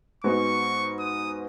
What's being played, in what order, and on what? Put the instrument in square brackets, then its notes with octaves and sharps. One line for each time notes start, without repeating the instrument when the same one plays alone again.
[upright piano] G#2 G#3 B3 F#4 [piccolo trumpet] C#6
[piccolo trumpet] D#6